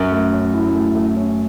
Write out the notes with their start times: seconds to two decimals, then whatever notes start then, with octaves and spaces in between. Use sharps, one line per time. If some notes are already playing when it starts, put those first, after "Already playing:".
Already playing: F#2
0.12 A3
0.33 C#4
0.54 E4
0.74 A3
0.95 A3
1.17 C#4